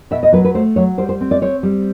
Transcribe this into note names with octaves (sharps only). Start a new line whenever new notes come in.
B2 E5
D#5
F#3 B4
B4
A3 C5
F#3 C#5
G3 C5
C5
C4
D5
C4 C#5
G3